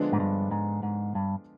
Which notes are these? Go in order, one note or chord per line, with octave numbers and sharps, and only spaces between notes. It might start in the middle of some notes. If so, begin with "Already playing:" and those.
Already playing: D3 F3 G#3 B3 D4
G#2
G2
G#2
G#2
G2